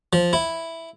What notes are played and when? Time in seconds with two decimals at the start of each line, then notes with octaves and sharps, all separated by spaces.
0.13 F3
0.33 E4